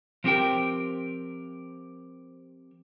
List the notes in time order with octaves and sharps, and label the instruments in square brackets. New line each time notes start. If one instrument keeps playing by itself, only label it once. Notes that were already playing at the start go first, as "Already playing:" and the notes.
[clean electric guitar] F3 C4 G4 A#4 G5